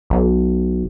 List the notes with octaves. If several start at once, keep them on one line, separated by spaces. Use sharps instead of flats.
B1